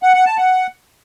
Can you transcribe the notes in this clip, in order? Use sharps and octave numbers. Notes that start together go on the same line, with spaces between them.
F#5
F#5
A5
F#5